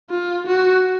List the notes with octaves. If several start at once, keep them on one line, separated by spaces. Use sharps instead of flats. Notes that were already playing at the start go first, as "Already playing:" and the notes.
F4
F#4